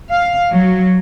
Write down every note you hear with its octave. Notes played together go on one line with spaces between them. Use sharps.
F5
F#3